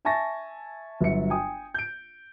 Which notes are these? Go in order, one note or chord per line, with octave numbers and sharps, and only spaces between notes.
E5 G#5 A5 C#6 A6 A#6
G1 F#3 F#4 E5 C#7
G5 G#5 D#6
G6 D7